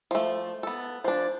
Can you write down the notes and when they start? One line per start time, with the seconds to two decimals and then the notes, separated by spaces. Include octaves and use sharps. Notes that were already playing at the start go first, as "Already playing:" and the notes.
0.11 F3 A3
0.63 B3 A4
1.04 F3 D4